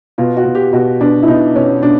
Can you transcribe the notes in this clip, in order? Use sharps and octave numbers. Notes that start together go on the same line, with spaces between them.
B2 F4
F#4
B2
G4
B2 F#4
B2 D4
E4
B2 D#4
B2 C#4
B2 D4